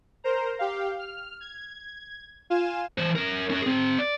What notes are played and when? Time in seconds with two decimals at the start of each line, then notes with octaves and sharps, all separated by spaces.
0.24 A#4 C5 A#5
0.59 G4 F5
0.99 F6
1.41 G#6
2.50 F4 F5 G#5 E7
2.98 E3 C5
3.16 C#4 A#4
3.50 C#4 A#4
3.62 C4 G#4
3.99 D5